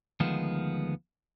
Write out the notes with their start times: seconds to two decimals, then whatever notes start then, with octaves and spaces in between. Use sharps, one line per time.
0.20 D2 D#3 F3 G#3 B3